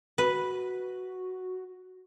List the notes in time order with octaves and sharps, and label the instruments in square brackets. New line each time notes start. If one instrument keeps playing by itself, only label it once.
[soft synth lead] F#4 [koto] B4